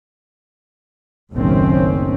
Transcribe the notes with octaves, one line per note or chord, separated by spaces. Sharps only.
F#1 B1 A2 D#3 C4 C#4